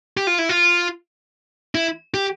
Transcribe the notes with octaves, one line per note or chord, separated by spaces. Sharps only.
G4
F4
E4
F4
E4
G4